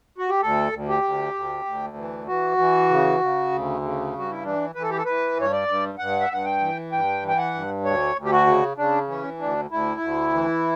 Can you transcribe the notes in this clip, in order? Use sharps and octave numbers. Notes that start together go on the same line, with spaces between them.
F#4
G4
D2 A4
D2
G4
D2
D2
D2
E3
E3 F#4
E3
C#3
C#3
D2
C#3
G2 F#4
E4
E3 D4
E3 B4
A4
G4
A4
E3 B4
G2 C#5
D5
G2
G2 F#5
E5
G2 F#5
G5
E3
G2 G5
E3
G5
F#5
G2
D2 C#5
D2
G4
F#4
C#3
C#3 D4
E3 C#4
D2 D4
D2 E4
D2
E3